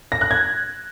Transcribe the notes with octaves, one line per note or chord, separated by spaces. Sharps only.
A#6
F#6
G#6